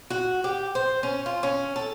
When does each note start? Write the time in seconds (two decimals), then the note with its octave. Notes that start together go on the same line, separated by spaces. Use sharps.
0.10 F#4
0.44 G4
0.75 C5
1.03 C#4
1.26 F4
1.43 C#4
1.76 A4